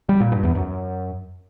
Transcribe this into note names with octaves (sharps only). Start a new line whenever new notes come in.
G3
A#2
G2
E2
F#2